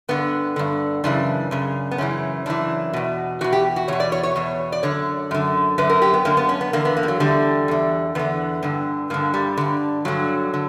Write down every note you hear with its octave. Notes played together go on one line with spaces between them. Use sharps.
G2 D3 B3
G2 D3
F#2 C#3 E3 D4
F#2 C#3
B3
F#2 C#3 E3 C#4
F#2 C#3 E3 D4
E2 B2
E2 B2 F#4
G4
F#4
E2 B2 C#5
D5
C#5
C#5
E2 B2
D5
F#2 D3 C#5
F#2 D3
F#2 D3 B4
A#4
G4
B3
F#2 D3 A#3
B3
C#4
B3
E2 D3 A#3
B3
A#3
G3
F#3
E2 D3 G3
E2 D3
E2 D3 B3
G2 D3
G2 D3 A#3
G3
G2 D3
G2 D3 F#3
D3